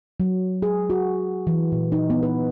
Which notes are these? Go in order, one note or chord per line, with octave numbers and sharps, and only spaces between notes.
F#3
G#4
F#4
E3
A#2
D#4
B3
B4